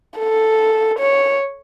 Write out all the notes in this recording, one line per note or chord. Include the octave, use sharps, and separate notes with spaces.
A4
C#5